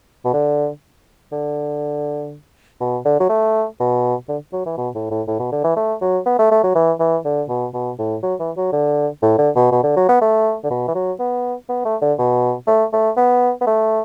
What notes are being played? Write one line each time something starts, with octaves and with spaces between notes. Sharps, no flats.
B2
D3
D3
B2
D3
F#3
A3
B2
D3
F#3
E3
B2
A2
A2
A2
B2
D3
E3
A3
F#3
B3
A3
A3
F#3
E3
E3
D3
B2
B2
A2
F#3
E3
F#3
D3
A2
D3
B2
B2
D3
F#3
B3
A3
D3
B2
E3
F#3
B3
B3
A3
D3
B2
A3
A3
B3
B3
A3